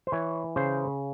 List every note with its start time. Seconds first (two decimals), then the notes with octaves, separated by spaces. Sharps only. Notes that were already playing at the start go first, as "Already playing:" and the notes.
0.07 C5
0.12 E3 C#5
0.56 C#3 C5